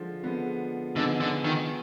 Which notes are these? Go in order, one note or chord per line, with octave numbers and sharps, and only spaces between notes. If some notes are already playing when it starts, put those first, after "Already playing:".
Already playing: D3 F3 G#3
D3 F3 G#3 B3
D3 F3 G#3 B3 D#4 G#4
D3
D#3